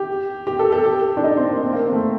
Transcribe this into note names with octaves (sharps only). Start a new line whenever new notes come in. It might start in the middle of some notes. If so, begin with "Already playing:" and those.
Already playing: G4
G4
A4
A4
G4
D4
D#4
C4
A#3
C4
A#3
C4
A3